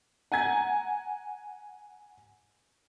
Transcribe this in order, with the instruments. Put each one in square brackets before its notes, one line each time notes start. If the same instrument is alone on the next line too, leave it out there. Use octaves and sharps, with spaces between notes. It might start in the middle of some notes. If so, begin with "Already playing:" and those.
[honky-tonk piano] F#5 G#5 A#5 G#6